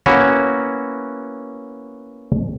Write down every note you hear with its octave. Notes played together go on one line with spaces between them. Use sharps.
A#3 B3 C#4 E4 F#4 C#5